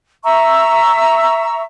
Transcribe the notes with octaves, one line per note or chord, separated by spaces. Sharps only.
E5 A#5 C#6 E6